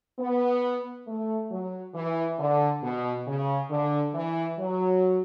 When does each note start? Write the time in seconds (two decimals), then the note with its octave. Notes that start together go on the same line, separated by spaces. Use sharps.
0.19 B3
1.08 A3
1.51 F#3
1.95 E3
2.39 D3
2.83 B2
3.27 C#3
3.71 D3
4.14 E3
4.59 F#3